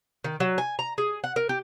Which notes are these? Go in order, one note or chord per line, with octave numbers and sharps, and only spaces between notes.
D#3
F#3
G#5
A#5
G#4
F#5
A#4
G4